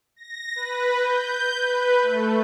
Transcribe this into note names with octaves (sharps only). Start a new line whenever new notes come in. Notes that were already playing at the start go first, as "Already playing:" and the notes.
A#6
B4
G6
B4
A3